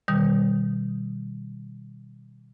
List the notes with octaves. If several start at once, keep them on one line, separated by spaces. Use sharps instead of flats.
B2 D#3 G3